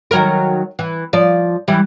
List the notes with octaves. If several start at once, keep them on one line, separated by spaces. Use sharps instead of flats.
D#3 F#3 A#4
E3
F3 D5
E3 G3